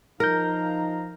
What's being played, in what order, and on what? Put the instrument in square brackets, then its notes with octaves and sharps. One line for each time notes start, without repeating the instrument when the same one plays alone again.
[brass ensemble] F3 F5 A#5 [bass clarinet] D#4 [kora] A#4 [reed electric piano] F6 G6